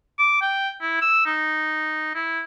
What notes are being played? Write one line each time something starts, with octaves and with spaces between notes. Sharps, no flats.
D6
G5
E4
E6
D#4
E4